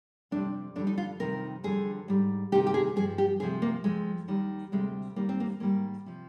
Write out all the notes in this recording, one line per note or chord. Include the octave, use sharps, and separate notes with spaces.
F2 C3 G3 D4
F2 D3 G3 D4
D#4
F4
F2 C3 D#3 G3 A#4
F2 D3 G3 G#4
G#2 G3
D2 C3 D#3 G4
G4
G#4
G2 F3 G#4
G4
D2 C3 F3 G#4
A#3
F2 D3 F3 G#3
D#2 D#3 G3
D2 C3 G3 G#3
D#2 D#3 G3 A#3
C4
A#3
G#2 D#3 G3 A#3
C3 F3